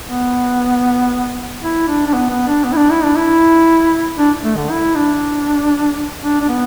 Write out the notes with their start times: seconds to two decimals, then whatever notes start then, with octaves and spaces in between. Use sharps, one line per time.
0.08 B3
1.62 E4
1.88 D4
2.07 D4
2.13 B3
2.30 B3
2.47 D4
2.65 B3
2.72 E4
2.77 D4
2.90 E4
3.04 D4
3.16 E4
4.18 D4
4.43 A3
4.57 D3
4.70 E4
4.95 D4
6.23 D4
6.41 D4
6.48 B3